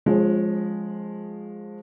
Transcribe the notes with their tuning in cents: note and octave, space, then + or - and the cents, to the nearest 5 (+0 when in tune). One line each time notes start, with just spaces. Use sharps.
F3 +15 G#3 +0 C#4 -15